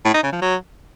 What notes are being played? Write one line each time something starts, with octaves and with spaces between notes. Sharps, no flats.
A2
D#4
C#3
F3
F#3